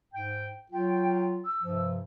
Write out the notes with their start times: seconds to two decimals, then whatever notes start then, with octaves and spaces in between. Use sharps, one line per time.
0.12 G#2 G5
0.72 F#3 F4 G5
1.45 E6
1.62 G2 C3 F3